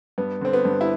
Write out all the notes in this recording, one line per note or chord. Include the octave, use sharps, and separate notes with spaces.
G2 B3
D3 C4
B3
G2
E4